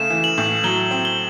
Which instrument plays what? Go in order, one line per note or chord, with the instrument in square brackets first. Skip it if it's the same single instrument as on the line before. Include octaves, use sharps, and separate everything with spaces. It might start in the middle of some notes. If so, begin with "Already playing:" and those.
Already playing: [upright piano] C#3 A3 [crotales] E7
[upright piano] E3
[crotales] F#7
[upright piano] A2
[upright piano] F#3 [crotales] G7
[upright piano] C4
[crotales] G7